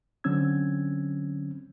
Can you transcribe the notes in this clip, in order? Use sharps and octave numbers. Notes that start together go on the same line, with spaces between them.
D3 F#3 C4 C#4 E6 G#6